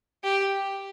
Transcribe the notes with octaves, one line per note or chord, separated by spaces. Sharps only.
G4